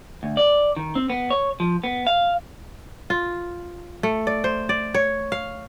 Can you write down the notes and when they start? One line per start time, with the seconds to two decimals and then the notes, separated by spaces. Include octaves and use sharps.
0.23 D2
0.37 D5
0.76 D#3
0.95 C4
1.10 B3
1.30 C#5
1.60 F3
1.84 B3
2.07 F5
3.10 F4
4.03 A3
4.27 D5
4.44 C5
4.69 D5
4.94 C#5
5.32 F5